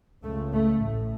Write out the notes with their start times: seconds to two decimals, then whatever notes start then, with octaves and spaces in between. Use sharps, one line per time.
0.24 C#2 C#3 A3
0.53 A3
0.82 A1 A2